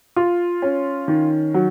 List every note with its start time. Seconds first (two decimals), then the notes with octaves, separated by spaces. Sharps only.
0.16 F4
0.62 C#4
1.08 D#3
1.54 F#3